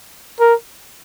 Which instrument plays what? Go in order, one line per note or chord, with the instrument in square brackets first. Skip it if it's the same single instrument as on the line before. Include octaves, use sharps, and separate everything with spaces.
[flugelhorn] A#4